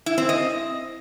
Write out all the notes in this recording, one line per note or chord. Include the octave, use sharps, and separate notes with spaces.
E4
C4
D#5